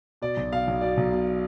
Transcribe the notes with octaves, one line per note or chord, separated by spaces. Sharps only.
B2 D5
B1
B2 F5
B1
B2 D5
B1
B2